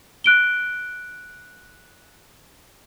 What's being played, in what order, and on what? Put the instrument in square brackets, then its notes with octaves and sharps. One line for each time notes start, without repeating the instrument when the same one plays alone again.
[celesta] F#6 D7 G7